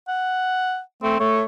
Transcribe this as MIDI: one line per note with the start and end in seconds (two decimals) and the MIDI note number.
0.08 0.80 78
1.03 1.15 57
1.03 1.16 60
1.20 1.43 57
1.20 1.43 73